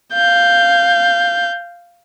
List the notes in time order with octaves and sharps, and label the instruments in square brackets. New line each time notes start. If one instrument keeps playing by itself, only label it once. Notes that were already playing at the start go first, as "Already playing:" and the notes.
[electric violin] F5 G6